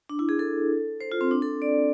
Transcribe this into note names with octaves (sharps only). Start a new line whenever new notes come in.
D4
E4
G#4
A4
C5
F4
C4
D4
A4
D5